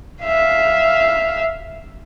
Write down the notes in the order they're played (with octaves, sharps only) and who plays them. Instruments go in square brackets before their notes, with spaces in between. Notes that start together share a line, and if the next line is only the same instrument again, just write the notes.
[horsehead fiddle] E5 F5